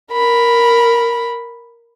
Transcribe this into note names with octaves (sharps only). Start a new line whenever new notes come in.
A#4 B5